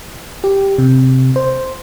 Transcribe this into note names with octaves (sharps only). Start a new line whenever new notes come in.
G4
C3
C5